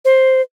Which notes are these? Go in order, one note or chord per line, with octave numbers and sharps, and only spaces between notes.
C5